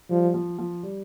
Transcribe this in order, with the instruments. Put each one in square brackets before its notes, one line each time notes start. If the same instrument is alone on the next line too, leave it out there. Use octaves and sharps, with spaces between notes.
[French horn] F3 [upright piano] G3
[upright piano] F3
F3
G3